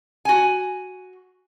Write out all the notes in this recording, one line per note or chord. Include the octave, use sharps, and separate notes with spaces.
F#4 G#5